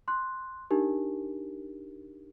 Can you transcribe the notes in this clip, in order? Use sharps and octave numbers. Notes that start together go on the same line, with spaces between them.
C6 F#6
D4 D#4 G4 A#4